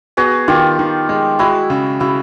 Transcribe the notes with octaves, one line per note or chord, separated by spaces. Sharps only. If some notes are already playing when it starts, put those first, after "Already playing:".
B3 F#4 G#4
D#3 F4 G4
D#3
G#3
G#3 E4 F#4
C#3
C#3 E4 F#4